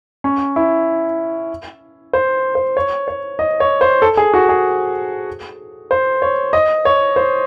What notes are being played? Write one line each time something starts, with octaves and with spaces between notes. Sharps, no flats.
C#4
E4
C5
C5
C#5
C#5
D#5
C#5
C5
A4
G#4
F#4
G#4
C5
C#5
D#5
C#5
C5